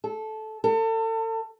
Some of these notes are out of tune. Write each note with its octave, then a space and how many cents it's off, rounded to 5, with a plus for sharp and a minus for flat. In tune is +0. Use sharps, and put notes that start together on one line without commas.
A4 -15
A4 +35